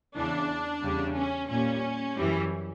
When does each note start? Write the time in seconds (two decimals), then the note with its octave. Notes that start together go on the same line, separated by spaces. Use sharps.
0.16 E2 C#3 E3 D4
0.83 E2 C#3 G3
1.17 C#4
1.50 A#2 G3 C#4
2.17 F#2 E3 G3